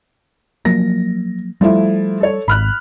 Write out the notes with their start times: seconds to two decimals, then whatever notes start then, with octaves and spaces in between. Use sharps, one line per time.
0.65 F3 F#3 A#3 A#6
1.61 F3 G3 A3 E4
2.20 A4 C#5
2.48 G#1 B5 F6 F#6